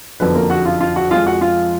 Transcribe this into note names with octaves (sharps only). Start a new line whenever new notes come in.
F#1 F2 D3 F#3 B3 B4
A#3 A#4
F#4 F#5
F4 F5
F4 F5
F#4 F#5
F2 F3 G#3 F4 F5
F#4 F#5
F4 F5